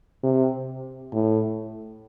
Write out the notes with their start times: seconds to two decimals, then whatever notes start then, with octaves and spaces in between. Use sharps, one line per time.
0.24 C3
1.13 A2